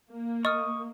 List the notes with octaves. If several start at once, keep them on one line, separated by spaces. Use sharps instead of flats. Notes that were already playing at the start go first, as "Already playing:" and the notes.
A#3
D#5 C#6 D#6 F6